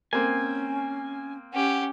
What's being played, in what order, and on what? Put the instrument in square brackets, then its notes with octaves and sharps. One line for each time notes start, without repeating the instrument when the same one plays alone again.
[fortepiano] A#3 C4 [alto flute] C#4 [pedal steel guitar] G#5
[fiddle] C#4 G4 [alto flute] F#5